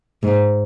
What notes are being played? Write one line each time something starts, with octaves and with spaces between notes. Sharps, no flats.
G#2